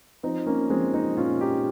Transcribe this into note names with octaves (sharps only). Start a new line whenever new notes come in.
F3 C4 D#4
A#3 C#4
F3 G#3 C4
C4 D#4
A#2 C#4 F4
D#4 G4